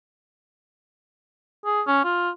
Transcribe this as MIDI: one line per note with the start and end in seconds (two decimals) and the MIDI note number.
1.65 1.82 68
1.87 2.03 61
2.04 2.30 65